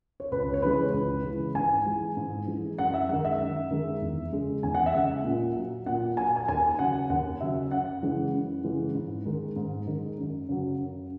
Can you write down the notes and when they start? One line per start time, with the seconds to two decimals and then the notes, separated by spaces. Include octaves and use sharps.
0.20 C#5
0.32 C#2 B4
0.54 C#5
0.62 C#3 E3 G#3 B4
0.94 C#2
1.24 C#3 E3 G#3
1.55 G#2 G#5
1.86 E3 G#3
2.17 G#2
2.47 E3 G#3
2.78 F#2 F#5
2.94 E5
3.09 D#3 G#3 F#5
3.25 E5
3.40 F#2
3.71 D#3 G#3
4.02 E2
4.32 C#3 G#3
4.63 E2 G#5
4.74 F#5
4.86 E5
4.94 C#3 G#3 F#5
5.24 A#2
5.56 F#3
5.86 A#2 F#5
6.17 F#3 G#5
6.36 G#5
6.48 D#2 G#5
6.79 C#3 F#3 F#5
7.10 D#2 F#5
7.41 C#3 F#3 E5
7.71 F#2 F#5
8.02 C#3 E3 G#3
8.33 F#2
8.64 C#3 E3 G#3
8.95 G#2
9.26 D#3 G#3
9.56 G#2
9.87 D#3 G#3
10.18 F#2
10.49 C#3 F#3
10.80 F#2